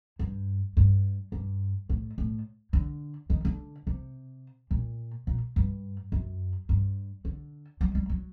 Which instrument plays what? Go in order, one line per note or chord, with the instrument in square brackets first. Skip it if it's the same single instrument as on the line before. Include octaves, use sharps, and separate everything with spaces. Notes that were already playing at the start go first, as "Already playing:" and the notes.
[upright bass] G2
G2
G2
A2
A2
D3
D#3
D3
C3
A#2
A#2
G2
F#2
G2
D3
F#3
G3
F#3